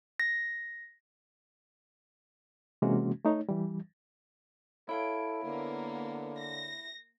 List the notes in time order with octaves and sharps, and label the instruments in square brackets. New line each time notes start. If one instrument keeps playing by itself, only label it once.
[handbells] A#6
[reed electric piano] C3 E3 G#3 A#3 C#4 F#4
A3 D#4 C#5
E3 G3
[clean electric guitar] E4 [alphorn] A4 [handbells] C#5 F5 D7
[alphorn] D3 [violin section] A#3 B3
[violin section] A#6